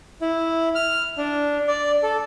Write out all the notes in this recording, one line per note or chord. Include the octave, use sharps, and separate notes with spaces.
E4
F6
D4
D5
A4